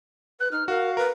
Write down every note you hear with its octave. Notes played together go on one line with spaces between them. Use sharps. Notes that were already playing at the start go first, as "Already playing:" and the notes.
B4 F#6
D#4 F6
F#4 A#4 F5
A#4 B4